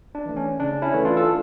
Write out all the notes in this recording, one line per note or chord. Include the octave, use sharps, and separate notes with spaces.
D4
E3 A3
C#4
C#3 D4
C#4 E4
E3 A3
D4 F4
A4